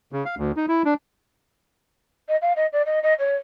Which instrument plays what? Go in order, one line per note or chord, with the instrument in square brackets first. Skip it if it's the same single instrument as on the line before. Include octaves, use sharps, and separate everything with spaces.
[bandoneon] C#3
F5
D2
D#4
E4
D4
[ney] D#5
F5
D#5
D5
D#5
D#5
C#5